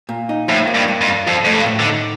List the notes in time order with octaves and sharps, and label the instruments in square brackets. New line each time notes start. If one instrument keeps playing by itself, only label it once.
[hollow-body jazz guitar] A#2
D#4
[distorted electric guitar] A2 [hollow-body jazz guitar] F3
[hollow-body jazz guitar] A#3
[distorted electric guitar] G2
[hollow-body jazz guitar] G2
[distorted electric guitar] F2
[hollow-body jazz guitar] G2
[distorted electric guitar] F2 [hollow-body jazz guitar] F3
[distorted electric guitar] F2 [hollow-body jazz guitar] A3
[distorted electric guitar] G2
[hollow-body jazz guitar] A2
[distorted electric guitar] D3
[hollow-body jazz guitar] D#4